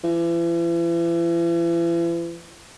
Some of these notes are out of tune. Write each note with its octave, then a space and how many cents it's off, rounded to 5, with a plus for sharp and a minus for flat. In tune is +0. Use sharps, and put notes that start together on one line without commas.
E3 +40